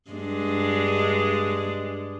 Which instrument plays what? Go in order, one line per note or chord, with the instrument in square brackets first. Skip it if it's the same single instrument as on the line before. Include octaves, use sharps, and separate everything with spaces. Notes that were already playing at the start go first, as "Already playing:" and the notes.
[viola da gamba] G2 G#3 D4